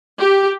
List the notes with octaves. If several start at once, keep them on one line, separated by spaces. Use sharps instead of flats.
G4